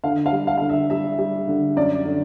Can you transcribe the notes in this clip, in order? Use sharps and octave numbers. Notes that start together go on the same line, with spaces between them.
D3 F5
F5
G3
F5
D3 F5
E5
G3 E5
G3
D3
F#2 D5
D3